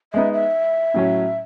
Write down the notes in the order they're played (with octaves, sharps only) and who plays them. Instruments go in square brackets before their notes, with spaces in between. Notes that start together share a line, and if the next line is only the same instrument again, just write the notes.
[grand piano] G#3 B3 D#4 [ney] E5
[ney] E5
[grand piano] A2 F#3 C#4